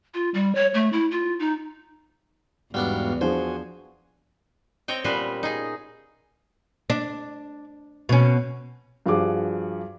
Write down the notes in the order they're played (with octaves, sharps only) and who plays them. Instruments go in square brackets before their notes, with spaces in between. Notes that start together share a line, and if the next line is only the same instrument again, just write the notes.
[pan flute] F4
G3
C#5
A3
E4
F4
D#4
[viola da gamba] E2 [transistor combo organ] G#2 F#4 F5 [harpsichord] G3 B3 D4
[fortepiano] F3 D4 G#4 [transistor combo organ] F#4 G#5 [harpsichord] C5
[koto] C4 C#5 D#5 G5
A#2 G3 B3 C#4 B4 C5
D#4 G#4
[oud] D4
B2 C#4
[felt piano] G2 F3 F#4 G#4 D6